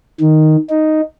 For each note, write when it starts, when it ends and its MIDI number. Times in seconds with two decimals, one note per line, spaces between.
0.20 0.56 51
0.70 1.01 63